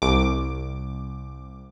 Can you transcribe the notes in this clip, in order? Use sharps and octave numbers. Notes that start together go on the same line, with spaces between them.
C2 D6